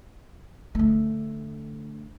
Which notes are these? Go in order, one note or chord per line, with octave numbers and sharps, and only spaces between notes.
D3 A3